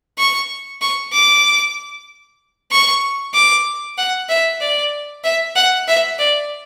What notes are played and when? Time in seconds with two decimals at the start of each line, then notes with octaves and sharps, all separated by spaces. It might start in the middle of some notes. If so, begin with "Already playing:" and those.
0.18 C#6
0.82 C#6
1.13 D6
2.71 C#6
3.34 D6
3.98 F#5
4.29 E5
4.61 D5
5.24 E5
5.56 F#5
5.88 E5
6.19 D5